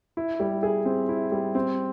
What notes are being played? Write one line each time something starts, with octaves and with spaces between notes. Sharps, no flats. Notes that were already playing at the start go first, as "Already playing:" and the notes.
E4
G3
G#4
C4
E4
G3
C4